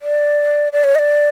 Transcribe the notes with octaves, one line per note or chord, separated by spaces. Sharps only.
D5
D5
C#5
D#5
D5